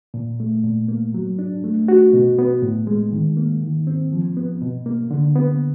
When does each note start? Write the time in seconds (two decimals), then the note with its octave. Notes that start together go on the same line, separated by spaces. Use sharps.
0.14 A#2
0.40 A3
0.64 A#2
0.88 A#3
1.14 F#3
1.39 D4
1.64 A3
1.88 F#4
2.13 B2
2.39 B3
2.62 A2
2.87 G#3
3.13 D#3
3.37 A#3
3.63 D#3
3.87 C4
4.12 F3
4.37 B3
4.61 B2
4.86 A#3
5.11 D3
5.35 B3